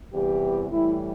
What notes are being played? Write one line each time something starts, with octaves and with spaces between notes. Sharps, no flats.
E2 C3 E3 G3 G4
A2 E3 G3 E4